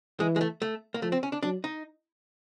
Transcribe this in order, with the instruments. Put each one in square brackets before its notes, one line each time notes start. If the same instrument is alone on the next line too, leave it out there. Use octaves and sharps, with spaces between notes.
[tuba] E3 [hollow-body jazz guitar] G#3
[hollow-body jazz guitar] G#3
A3
A3
A#3
[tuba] F3 [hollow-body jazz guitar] A3
[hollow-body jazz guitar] C4
C#4
D4
[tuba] F#3 [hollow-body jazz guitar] D4
[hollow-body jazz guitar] D#4